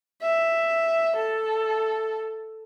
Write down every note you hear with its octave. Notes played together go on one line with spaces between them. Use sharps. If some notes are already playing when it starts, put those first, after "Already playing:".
E5
A4